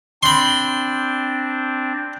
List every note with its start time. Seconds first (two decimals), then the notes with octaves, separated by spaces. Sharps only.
0.23 C4 D4 B5 C6